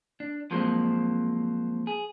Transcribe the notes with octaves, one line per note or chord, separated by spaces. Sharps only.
D4
F3 F#3 G#3 A#3 C4
G#4